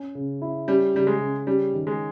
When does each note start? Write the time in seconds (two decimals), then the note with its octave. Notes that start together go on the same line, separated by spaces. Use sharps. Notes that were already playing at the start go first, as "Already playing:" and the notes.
Already playing: C#4
0.15 C#3
0.42 E4
0.68 G3 C#4
0.94 C#3 G3
1.07 G#3
1.21 C#3
1.47 G3 C#4
1.74 D#3
1.87 G#3